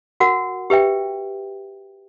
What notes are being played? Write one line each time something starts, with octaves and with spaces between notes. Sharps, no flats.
F#4 A#4 F#5
G4 B4 E5 G5